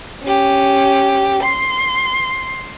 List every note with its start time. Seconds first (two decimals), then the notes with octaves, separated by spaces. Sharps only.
0.23 C#4 G4
1.43 C6